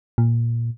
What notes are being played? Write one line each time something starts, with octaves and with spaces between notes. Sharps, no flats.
A#2